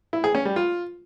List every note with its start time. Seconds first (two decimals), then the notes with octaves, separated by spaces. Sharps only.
0.13 E4
0.24 G#4
0.35 C#4
0.45 G3
0.56 F4